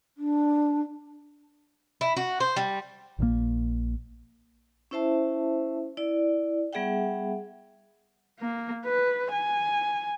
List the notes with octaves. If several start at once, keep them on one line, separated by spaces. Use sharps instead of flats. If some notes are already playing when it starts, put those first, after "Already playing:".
D4
E4
F#4
C5
G3
A#1 A#2 C#3 A#3
C#4 E4 C5 E5 A5
E4 D5
G3 B3 G#4 E5 F#5 G5
A#3
B4
G#5